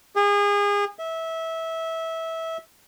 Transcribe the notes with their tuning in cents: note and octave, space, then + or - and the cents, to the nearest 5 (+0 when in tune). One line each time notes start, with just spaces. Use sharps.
G#4 -30
E5 -20